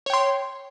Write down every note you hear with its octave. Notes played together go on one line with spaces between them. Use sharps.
C#5 G5 C6